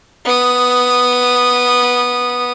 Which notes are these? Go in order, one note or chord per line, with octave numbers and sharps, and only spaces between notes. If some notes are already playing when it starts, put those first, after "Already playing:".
B3 D#6